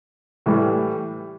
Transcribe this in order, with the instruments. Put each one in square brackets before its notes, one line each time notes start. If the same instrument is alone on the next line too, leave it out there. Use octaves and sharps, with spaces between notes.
[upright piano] A2 E3 G3